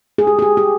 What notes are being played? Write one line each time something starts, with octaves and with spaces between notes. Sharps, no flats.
G#4
G4
G#4
G4
G4